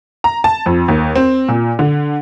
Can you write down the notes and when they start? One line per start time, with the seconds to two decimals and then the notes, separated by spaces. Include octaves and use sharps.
0.24 A#5
0.44 A5
0.66 F2
0.88 D#2
1.16 C4
1.49 A#2
1.79 D3